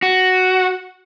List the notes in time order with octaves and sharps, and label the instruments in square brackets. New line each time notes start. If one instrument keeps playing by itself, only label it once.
[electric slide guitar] F#4